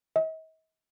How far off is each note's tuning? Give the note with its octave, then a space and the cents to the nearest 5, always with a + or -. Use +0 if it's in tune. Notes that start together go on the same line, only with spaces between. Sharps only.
D#5 +45